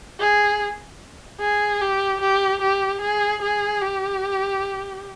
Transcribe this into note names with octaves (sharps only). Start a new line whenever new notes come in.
G#4
G#4
G4
G4
G4
G#4
G#4
G4